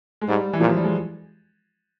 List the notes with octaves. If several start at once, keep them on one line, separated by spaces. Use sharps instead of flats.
G#3
G#2 G3
E3
A#2 F3
F#3
G3
G#3